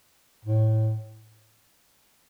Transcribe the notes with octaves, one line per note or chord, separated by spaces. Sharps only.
A2